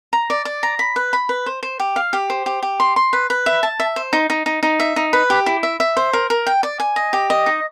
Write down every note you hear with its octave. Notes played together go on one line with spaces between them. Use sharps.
A#5
D5
D5
A#5
B5
B4
B5
B4
C5
C5
G4
F5
G4
C5
G4
G4
C6
C6
B4
B4
E5
A5
E5
C5
D#4
D#4
D#4
D#4
E5
D#4
B4
G4
E4
E5
E5
C5
A#4
A#4
G5
D5
G#5
D#5
G4
D#5
D#4